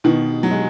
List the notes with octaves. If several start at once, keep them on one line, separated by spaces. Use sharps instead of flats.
B2 D#3
F#3
G#3